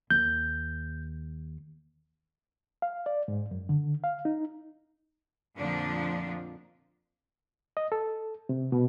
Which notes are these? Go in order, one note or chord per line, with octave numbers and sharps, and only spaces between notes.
D#2 G6
F5
D5
G#2
F#2
D3
F5
D#4
F2 A#2 D3 F3 A#3 D4
D#5
A4
C3
B2